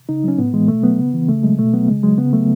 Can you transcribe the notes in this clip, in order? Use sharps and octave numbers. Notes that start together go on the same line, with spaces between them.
C#3 D#4
F#3 C#4
A2 B3
E3 G#3
B2 A3
F#3 B3
C#3
E3
C#3 A3
F#3 G#3
B2 A3
F#3 B3
C#3 G#3
F#3 G#3
C#3 B3
F#3 A3